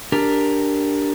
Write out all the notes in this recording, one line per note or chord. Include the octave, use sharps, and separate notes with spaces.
D4 G4 A#4